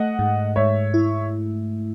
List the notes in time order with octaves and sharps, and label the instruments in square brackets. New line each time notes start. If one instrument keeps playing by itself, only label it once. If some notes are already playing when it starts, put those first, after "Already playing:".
Already playing: [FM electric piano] A3 [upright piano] D#5 F#5
[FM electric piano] G#2
[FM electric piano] G#2 [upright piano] C#5 E5
[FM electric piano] E4